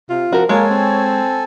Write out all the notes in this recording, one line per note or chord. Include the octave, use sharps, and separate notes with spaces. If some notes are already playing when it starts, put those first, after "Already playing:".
C3 F4
F3 F#4 A#4
G#3 A#3 A4 C#5 G#5
C4